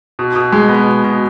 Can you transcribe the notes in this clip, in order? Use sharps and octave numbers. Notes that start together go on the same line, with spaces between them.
B2
B2
G#3
B3
B2
B2